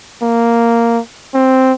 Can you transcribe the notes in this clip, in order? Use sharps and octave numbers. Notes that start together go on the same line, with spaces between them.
A#3
C4